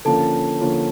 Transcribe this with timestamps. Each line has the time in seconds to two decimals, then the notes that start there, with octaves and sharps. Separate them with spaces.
0.05 D3 F3 A#3 C#4 F4 A4 A5
0.61 D3 F3 A#3 C#4 F4